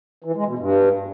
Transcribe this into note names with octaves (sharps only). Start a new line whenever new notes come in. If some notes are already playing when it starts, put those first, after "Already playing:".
E3
G#3
B2
G2